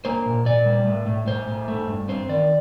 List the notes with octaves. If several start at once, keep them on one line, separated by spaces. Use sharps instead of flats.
A#3 C5
A#2
A#2 D5
G3
A2
A2
A2 C5
A2
A3
G2
C4 C5
D#3 D5